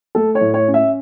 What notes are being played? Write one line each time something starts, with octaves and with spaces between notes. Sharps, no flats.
A3 A4
C#5
A2
C#5
C#4
E5